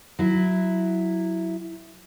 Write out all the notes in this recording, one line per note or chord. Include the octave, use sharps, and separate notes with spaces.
F#3 E4